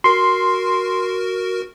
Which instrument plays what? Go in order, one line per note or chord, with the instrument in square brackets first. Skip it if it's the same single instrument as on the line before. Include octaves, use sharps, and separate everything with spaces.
[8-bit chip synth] F#4 A#4 [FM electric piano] C6